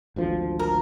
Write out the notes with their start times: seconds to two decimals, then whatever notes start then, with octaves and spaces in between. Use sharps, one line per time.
0.16 G#1 D2 F3
0.60 A#4